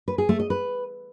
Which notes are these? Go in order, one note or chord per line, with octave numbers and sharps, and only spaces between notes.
B4
G#4
A3
D#5
B4